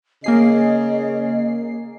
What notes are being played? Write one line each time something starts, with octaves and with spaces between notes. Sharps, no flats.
C#3 A#3 G#4 D#5 C7